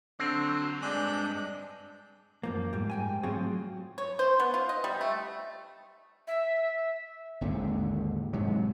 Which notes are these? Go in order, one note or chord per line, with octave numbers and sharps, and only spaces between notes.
D3 F#3 C4
G2 G#3 D4 F#6 G6
F#2 F3 A#3
G#2 G3
G#2 G5 G#5
F#3 A3 C4 F4 F#4 G#4
C#5
C5
B3
F4
D#5
G3
A3
E5
G#1 D#2 D3
G#2 C3 F#3